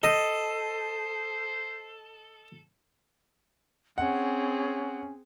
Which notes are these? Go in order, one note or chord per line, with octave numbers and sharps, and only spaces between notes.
A4 C5 D#5
C4 C#4 G#4 F#5